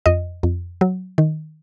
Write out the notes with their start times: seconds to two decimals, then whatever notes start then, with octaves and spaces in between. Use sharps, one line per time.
0.06 F2 D#5
0.43 F2
0.81 F#3
1.18 D#3